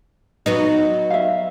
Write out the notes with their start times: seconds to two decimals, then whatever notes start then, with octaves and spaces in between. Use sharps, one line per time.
0.46 F#3 B3 D#4
1.10 E5 F5